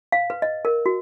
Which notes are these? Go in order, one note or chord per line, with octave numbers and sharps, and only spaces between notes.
F5
B4
D#5
A#4
F#4